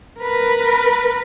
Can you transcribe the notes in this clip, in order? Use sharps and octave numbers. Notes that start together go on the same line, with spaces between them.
A#4 B4